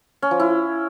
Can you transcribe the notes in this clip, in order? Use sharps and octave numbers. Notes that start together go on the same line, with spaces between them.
C#4
F3
E4